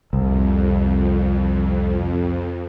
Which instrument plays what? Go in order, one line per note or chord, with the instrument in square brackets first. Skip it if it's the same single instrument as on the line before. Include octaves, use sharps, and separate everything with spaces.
[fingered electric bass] C2 [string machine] F2